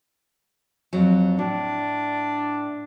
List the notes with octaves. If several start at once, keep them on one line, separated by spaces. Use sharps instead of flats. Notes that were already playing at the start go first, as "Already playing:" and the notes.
F2 F#3
A2 D4